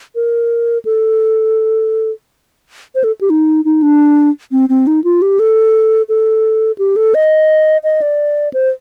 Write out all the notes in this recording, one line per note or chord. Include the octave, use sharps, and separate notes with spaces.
A#4
A4
C5
A4
G4
D#4
D#4
D4
C4
C4
D#4
F4
G4
A4
A4
G4
A4
D#5
D#5
D5
C5